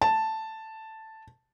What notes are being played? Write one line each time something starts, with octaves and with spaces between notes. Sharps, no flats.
A5